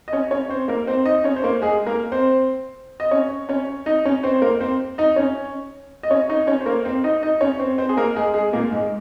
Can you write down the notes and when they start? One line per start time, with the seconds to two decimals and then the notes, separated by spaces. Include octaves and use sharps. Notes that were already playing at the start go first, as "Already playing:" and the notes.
0.08 D#5
0.13 C#4 C#5
0.31 C#4 C#5
0.50 C4 C5
0.68 A#3 A#4
0.87 C4 C5
1.05 D#4 D#5
1.24 C#4 C#5
1.36 C5
1.43 A#3 A#4
1.62 G#3 G#4
1.86 A#3 A#4
2.12 C4 C5
3.00 D#5
3.11 C#4 C#5
3.49 C#4 C#5
3.86 D#4 D#5
4.05 C#4 C#5
4.23 C4 C5
4.36 C5
4.42 A#3 A#4
4.61 C4 C5
4.98 D#4 D#5
5.16 C#4 C#5
6.03 D#5
6.10 C#4 C#5
6.30 D#4 D#5
6.47 C#4 C#5
6.60 C5
6.66 A#3 A#4
6.84 C4 C5
7.04 D#4 D#5
7.23 D#4 D#5
7.41 C#4 C#5
7.60 C4 C5
7.78 C4 C5
7.89 G#4
7.97 A#3 A#4
8.16 G#3 G#4
8.34 G#3 G#4
8.53 A#2 A#3
8.71 G#2 G#3